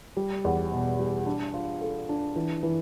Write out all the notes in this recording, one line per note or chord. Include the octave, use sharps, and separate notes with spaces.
G3
E2
B2
G3
D4
F4
A4
D4
E3
E3